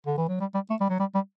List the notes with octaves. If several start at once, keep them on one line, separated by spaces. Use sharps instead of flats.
D3
E3
F#3
G3
G3
A3
G3
F#3
G3
G3